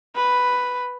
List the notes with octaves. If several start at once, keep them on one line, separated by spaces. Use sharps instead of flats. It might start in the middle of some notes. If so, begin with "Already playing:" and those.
B4